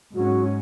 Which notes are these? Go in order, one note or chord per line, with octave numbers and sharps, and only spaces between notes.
G#2 F#3 C#4 F#4